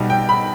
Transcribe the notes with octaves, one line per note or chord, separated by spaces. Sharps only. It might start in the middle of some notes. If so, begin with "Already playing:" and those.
Already playing: B1 B2 G3
G5
B5